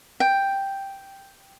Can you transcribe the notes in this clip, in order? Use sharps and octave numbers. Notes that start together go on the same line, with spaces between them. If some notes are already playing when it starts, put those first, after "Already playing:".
G5